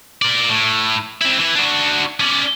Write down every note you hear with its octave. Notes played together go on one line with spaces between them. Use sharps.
A#4 D5
A2
C4 E4
E3 E4
D4 F#4
C#4 D5